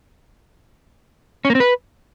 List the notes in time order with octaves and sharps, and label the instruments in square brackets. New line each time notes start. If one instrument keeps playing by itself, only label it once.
[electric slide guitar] C#4
A#3
C4
B4